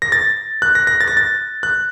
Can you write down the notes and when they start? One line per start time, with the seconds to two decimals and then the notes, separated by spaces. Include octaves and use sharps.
0.02 A#6
0.12 A6
0.62 F#6
0.75 A#6
0.87 A#6
1.01 A6
1.08 A#6
1.17 A6
1.63 F#6